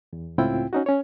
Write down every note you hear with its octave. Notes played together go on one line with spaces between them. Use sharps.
E2
C#2 A2 C4 E4 F4 G5
C#4 D#4 F#4
C#4 C#5